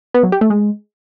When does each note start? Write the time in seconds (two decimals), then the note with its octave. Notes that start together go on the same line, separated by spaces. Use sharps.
0.14 B3
0.23 F#3
0.32 G4
0.41 A3
0.50 G#3